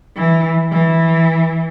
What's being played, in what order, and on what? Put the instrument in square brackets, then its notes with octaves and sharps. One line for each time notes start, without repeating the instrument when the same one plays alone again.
[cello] E3
E3